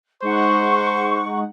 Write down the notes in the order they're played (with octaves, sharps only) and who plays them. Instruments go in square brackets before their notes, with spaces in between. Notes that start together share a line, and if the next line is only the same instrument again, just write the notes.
[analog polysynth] G#3 D#4 F#5 [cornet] C5 [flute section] C#6